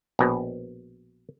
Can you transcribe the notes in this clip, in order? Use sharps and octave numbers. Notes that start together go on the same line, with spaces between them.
A#1 B2